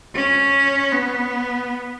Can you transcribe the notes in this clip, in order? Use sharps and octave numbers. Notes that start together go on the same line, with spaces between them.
C#4
B3